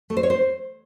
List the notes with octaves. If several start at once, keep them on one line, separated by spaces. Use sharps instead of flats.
A3
C5
C#5
C5